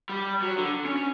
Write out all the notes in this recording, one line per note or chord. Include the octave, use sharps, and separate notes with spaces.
G3
F#3
D3
C#4
C#4